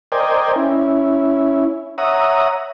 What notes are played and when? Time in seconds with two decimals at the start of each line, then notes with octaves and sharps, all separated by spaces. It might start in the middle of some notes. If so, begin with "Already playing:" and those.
0.12 A#4 C5 D5 D#5 G5 G#5
0.56 C#4 E4
1.98 C#5 E5 F#5 A#5 D#6